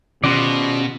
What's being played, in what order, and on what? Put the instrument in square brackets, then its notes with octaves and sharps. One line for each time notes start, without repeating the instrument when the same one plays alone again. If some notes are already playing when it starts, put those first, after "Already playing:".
[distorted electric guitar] B2 [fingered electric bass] D#3 C#4 [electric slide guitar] F4 F#4 D5